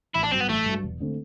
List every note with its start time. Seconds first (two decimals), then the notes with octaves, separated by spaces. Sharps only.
0.15 A1 E4
0.23 D4
0.32 G2 F#3 C4
0.40 B3
0.49 A1 A3
0.66 G2 F#3
0.83 E1
1.00 D3 A3 C4